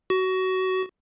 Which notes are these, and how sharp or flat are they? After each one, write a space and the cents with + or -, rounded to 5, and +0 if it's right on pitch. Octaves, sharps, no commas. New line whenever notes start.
F#4 +20